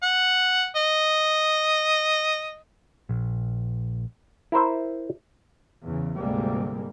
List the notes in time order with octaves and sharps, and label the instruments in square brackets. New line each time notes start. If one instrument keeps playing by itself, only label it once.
[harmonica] F#5
D#5
[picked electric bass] A#1
[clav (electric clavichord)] E4 A#4 C5 E5
[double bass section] E2 C#3
D2 G#2 C3 G3 G#3 A#3